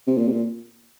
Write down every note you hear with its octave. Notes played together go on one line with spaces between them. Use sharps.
C3
A#2
C3
A#2